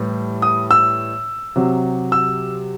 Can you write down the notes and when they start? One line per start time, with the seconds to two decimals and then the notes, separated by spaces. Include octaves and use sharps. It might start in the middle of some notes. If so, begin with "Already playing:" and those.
Already playing: A2 E3 G3
0.42 D#6
0.71 E6
1.56 C3 F#3
2.12 E6